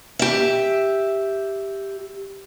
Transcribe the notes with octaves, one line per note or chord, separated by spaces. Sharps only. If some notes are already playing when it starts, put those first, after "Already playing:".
G4 E5